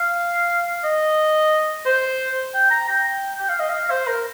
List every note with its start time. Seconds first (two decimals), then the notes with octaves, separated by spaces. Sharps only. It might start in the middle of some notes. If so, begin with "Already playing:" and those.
Already playing: F5
0.84 D#5
1.86 C5
2.54 G5
2.70 A#5
2.89 G5
3.40 G5
3.49 F5
3.60 D#5
3.70 F5
3.90 C5
4.07 A#4